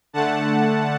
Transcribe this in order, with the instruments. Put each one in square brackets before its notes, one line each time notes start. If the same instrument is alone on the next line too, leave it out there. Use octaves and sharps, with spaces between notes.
[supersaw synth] D3 A3 F#5 A5